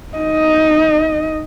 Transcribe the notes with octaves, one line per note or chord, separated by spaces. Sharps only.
D#4 D#5